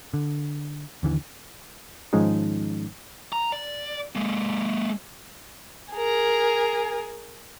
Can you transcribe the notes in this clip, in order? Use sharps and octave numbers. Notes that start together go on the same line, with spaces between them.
D3
D#2 D3 E3
G#2 D#3 F3 G#3 C#4 D#4
A#5
D5
G#3 A#3
G#4 A#4